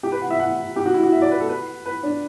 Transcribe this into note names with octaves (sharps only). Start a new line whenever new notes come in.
G4
B4
F#5
E5
F#5
G4
F#4
E4
F#4
E5
D5
B4
A4
B4
B4
D4